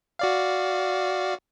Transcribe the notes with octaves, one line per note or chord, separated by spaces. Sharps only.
F#4 D5 F5